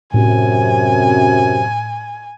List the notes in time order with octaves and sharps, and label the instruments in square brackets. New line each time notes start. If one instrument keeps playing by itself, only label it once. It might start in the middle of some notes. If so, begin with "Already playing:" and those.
[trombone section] F#2 C3 [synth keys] A2 [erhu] G#5